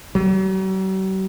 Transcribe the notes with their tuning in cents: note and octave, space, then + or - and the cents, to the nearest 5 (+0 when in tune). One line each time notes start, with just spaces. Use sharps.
F#3 +45